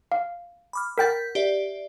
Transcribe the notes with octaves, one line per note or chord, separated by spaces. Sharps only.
F5
B5 D6 F6
A#4 F#5 G5 G6 A6 B6
G4 D5 E5